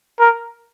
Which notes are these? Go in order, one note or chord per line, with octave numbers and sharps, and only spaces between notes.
A#4